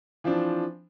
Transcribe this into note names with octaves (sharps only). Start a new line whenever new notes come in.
E3 F3 C4 D4